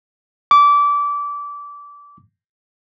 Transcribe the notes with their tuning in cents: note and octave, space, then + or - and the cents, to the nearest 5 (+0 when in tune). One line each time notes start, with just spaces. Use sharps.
D6 -20